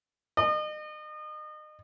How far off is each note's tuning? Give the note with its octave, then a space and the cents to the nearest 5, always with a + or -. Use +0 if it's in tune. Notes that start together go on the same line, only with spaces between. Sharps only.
D#5 -35